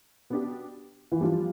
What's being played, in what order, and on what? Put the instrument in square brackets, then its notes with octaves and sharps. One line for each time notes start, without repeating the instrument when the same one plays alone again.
[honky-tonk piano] B2 B3 D4 G4
[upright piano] E3
[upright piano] F3 [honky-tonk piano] G3 D4 F4